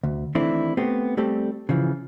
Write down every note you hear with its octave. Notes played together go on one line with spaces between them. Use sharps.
D2
D#3 E3 A3 C4 D4 E4
A3 B3 C4 G4
G3 A3 C4 G4 A4
C#3 E3 F3